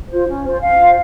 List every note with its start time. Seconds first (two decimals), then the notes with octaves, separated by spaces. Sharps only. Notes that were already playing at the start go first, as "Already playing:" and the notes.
0.10 F4 C5
0.28 C#4
0.44 F4 C5
0.61 C#4 F5
0.79 F4 C5